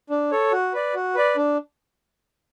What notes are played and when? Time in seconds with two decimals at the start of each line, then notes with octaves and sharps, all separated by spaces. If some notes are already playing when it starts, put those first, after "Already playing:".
0.10 D4
0.31 A4 C#5
0.52 F#4
0.73 B4 D5
0.94 F#4
1.15 B4 D5
1.37 D4